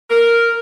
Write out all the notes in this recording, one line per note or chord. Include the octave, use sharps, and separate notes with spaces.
A#4